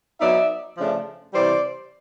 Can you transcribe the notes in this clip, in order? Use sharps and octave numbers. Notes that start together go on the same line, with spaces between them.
F#3 B3 D#4 D5 E5
C#3 F3 A3 D4
C3 E3 G3 C5 D5